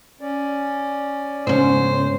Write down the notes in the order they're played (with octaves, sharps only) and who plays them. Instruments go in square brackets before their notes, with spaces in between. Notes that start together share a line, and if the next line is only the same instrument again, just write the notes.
[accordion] C#4 D5
[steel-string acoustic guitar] D2 C#4 [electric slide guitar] G#2 C#3 [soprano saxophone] C5